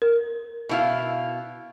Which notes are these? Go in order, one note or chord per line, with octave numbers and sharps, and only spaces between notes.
A#4
B2 E4 F5